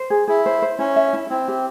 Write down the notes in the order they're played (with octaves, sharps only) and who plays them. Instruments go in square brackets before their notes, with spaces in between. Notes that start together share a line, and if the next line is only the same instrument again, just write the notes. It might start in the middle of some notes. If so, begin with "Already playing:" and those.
Already playing: [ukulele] C5
G#4
[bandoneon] E4 [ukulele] G#4
[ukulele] C5
C5
[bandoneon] C#4 [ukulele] E4
[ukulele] E5
E4
[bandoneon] C4 [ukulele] E4
[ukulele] G4